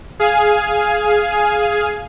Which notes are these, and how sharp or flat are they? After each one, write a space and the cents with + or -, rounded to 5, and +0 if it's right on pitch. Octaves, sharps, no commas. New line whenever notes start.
G#4 +10 F5 +0 G#5 +5